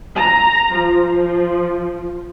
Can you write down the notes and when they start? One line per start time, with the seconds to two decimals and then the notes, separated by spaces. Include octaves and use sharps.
0.15 A#5
0.77 F3